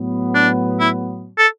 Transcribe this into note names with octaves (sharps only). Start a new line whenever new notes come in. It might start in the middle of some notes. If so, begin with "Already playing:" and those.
Already playing: A2 F#3 B3
D4
E4
A4